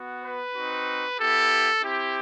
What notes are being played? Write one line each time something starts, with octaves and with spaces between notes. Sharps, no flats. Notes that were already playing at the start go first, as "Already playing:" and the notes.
Already playing: B3 F#4
B4
C4 D#4 F#4
B3 E4 G4 A4
C4 E4 G4